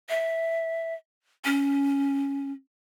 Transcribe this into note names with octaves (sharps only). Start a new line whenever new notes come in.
E5
C#4